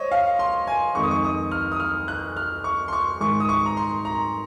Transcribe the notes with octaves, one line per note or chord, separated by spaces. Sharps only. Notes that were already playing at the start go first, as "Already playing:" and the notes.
Already playing: C5 C#5 D#5
F5
C6
G#5
F2 D#3 G#3 C#6
D#6
C#6
D#6
F6
D#6
F6
F#6
F6
C#6
C6
C#6
G#2 D#3 G#3 C#6
D#6
C#6
A#5
C6
A#5